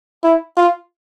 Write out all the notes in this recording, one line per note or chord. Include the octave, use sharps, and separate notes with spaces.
E4
F4